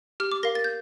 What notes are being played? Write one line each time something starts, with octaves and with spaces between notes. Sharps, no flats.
G4 F6
D6
A#4 F5 A#6
A6
G6